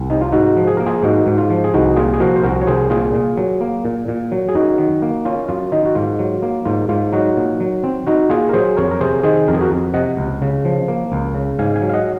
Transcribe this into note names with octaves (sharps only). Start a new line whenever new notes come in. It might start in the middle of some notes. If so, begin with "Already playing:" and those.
Already playing: C2
C3 D#4
F4
G#2 D#4 F#4
F3
G#4
A#3 A#4
F4 G#4
G#2 D#4 F#4
G#2
F4
F3
G#4
C2 D#4 F#4
A#2 F4 G#4
G#4
F3 F#4 A#4
C5
C2 F#4 A#4
C#5
C2 G#4 C5
A#2 F4 G#4
A#2
F#3
A#3
A#2
A#2
F#3
G#4
F#2 D#4 F#4
D#3
A#3
C#4 F4
F#2 F4
D#3 D#4
F#4
G#2 F4
F#3
A#3
G#2 F4
G#2 F4
F#3 D#4 F#4
A#2
F#3
C4
D#4 F#4
A#2 F4 G#4
A#4
F#3 G#4 C5
F2 A#4 C#5
A#4
C3 G#4 C5
D#3 G#4 C5
F2 A#4
G#4
F#4 A#4
F2
C3 D#5 F#5
C#2
C#3
F3
A#3
C#2
C#3
G#2 F5 G#5
F5 G#5
F#3
F5
D#5 F#5